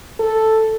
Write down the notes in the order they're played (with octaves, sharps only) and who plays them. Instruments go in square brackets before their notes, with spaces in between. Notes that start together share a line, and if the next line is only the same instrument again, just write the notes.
[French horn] A4